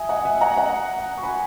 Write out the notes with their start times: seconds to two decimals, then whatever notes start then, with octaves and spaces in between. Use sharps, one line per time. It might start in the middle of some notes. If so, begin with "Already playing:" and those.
Already playing: E5 G#5 D#6
0.09 D#5 F#5
0.25 E5 G#5
0.41 F#5 A#5
0.57 F#5 A#5
1.17 C#6
1.23 G#5 B5